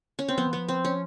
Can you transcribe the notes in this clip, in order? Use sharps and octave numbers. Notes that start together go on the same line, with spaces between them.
C#4
C4
F3 B3
E3
F3 B3
C4
C#4